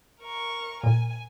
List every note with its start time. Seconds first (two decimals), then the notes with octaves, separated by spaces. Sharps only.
0.21 A#4 C#6
0.83 A#2 G#5